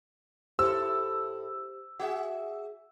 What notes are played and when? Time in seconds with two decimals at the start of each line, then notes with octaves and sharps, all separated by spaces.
0.59 A2 E4 G4 A4 C5 E6
1.99 F#4 G#4 E5 F#5